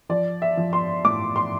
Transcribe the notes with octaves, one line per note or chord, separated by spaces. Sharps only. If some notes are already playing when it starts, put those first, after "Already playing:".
F3 D5
E5
F3
C6
A2 D6
C6